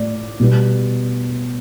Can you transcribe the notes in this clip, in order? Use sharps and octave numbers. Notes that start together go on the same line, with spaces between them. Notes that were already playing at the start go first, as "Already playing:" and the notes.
Already playing: A2 A3 D5
B2 G3 B3